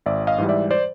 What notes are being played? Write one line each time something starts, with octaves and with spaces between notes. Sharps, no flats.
G#1 D5 E5
D#5 F5
G#2 E3 G3
D5 E5
C5 D5